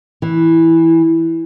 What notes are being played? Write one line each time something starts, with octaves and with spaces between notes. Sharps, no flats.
E3